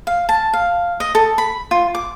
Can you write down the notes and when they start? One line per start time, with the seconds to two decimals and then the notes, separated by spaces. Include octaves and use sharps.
0.07 F5
0.29 A5
0.53 F5
1.00 D#5
1.15 A4
1.38 B5
1.71 F4
1.95 D6